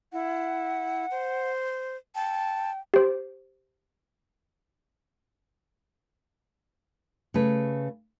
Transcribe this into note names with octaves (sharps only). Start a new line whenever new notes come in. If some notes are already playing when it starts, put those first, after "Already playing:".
E4 F#5
C5
G5 A5
G4 C5
C#3 A3 B4